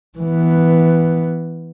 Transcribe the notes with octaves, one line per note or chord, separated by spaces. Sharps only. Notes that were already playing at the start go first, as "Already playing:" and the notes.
E3 B3